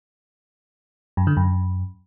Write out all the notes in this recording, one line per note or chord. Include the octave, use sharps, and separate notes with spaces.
F#2
D3
F#2